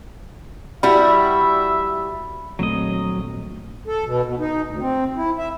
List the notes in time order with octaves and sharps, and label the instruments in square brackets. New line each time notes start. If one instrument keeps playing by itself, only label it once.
[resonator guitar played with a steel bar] G3 E4 F#4 [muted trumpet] E5 [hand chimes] B5
[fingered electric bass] D#1 A3 [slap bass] A#1 C4 [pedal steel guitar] F#3 D#5
[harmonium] A4
B2
B2
D#4
D2
C4
E4
E5